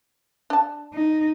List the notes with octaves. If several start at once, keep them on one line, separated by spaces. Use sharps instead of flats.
D4 A5
D#4